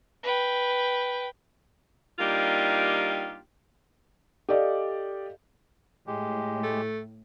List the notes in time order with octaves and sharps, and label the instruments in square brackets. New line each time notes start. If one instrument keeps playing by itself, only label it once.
[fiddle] B4 G5
[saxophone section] G3 A#3 D4 D#4 F4 G4
[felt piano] G4 A4 D5 D#5 F5
[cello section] A2 [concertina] G#3 G4
[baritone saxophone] A3